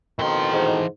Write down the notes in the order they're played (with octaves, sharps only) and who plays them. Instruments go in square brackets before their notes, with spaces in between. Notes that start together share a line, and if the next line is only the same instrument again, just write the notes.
[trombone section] F2 B2 D#3 [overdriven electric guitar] E3 C6
[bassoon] G#2